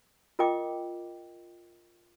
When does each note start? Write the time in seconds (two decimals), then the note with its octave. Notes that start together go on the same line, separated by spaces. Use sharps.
0.39 F4 A#4 D#5 G5 D6